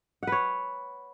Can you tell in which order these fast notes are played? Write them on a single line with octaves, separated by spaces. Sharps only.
F#5 B4 C#5